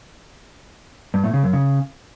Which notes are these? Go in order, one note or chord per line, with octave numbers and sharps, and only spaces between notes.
G2
A2
C#3
F#2
C#3